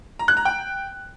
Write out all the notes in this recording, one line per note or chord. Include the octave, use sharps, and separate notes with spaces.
A#5
F#6
A#5
G5